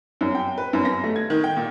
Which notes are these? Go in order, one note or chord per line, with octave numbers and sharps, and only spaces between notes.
F#2
G5
B4
F#2
A#6
A3
G#6
D#3
G5
A#2